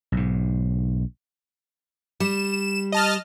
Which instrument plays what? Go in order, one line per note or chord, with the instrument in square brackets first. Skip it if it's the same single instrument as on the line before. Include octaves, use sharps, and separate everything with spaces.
[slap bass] B1 G#2
[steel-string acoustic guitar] G3 [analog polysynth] E7
[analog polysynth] D#5 A5 F6